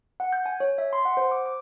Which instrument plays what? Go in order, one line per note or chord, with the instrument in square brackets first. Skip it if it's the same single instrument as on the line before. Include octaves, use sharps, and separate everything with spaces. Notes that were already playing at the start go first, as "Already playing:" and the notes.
[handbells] F#5
G6
G#5
C#5
E5
C6
F#5
C5
D6
D6